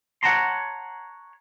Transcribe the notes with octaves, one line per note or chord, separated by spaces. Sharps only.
C#5 F#5 G5 A5 A#5 C6